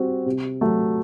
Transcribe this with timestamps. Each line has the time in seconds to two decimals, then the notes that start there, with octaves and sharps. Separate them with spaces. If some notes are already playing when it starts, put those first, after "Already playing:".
Already playing: G3 C4 F#4
0.26 C3
0.61 F#3 A3